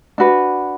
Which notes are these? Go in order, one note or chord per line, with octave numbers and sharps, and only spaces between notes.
D4 F#4 B4